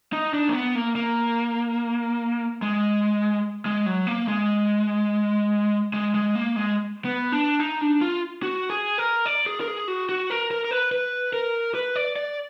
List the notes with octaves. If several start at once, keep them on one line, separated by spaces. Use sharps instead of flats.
D#4
D4
A#3
B3
A#3
A#3
G#3
G#3
F#3
A#3
G#3
G#3
G#3
A#3
G#3
B3
D4
D#4
D4
F4
F#4
G#4
A#4
D5
G#4
A#4
G#4
F#4
F#4
A#4
A#4
A#4
B4
B4
A#4
B4
D5
D5